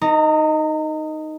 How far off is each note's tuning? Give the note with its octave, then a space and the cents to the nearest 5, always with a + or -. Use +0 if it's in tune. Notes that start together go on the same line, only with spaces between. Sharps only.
D#4 +0 A#4 +0 A#5 -35